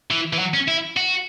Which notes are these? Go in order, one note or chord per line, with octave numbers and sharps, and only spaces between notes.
E3
E3
F#3
C#4
E4
F#4